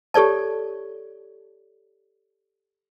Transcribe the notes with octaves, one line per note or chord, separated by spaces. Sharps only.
G4 A4 C#5 D5 A5